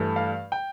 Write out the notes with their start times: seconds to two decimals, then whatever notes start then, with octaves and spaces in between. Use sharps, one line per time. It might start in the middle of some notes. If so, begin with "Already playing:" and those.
Already playing: G2 E3 A3
0.16 F5
0.52 G5